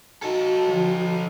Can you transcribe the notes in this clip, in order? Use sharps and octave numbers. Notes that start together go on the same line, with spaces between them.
D#4 F#4 A4
D3 F3